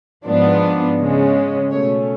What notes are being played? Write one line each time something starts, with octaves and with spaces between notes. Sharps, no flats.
G#2 F3 B3 D4
C#3 G#3 C#4
B2 A3 C#4 C#5